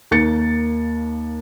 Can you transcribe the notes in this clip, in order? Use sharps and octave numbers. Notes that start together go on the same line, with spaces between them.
D#2 A#3 A6 C#7